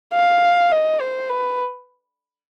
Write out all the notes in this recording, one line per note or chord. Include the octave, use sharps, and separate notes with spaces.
F5
D#5
C5
B4